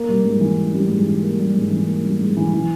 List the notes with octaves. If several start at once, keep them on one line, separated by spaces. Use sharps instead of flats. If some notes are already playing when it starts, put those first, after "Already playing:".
Already playing: A#3
G3
G#2
E3
A#3
G3
G#2
E3
A#3
G3
G#2
E3
A#3
G3
G#2
E3
E3